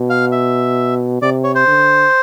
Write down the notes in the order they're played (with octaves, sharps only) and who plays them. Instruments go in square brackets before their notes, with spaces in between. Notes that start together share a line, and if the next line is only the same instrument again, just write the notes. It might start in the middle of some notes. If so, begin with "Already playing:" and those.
Already playing: [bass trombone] B2
[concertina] F5
E5
[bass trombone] C3 [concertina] D5
[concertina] C#5
C5
[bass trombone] D3